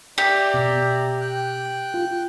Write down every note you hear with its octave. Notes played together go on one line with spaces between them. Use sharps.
G4 D5 E5 A#5
B2
G5 F#6
F4